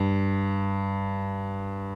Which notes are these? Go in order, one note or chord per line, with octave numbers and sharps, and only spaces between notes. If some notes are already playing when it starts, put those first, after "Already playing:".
Already playing: G2